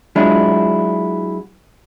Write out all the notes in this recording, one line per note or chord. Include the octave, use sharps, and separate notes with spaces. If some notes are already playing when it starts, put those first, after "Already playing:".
F#3 G#3 D4 E4 F4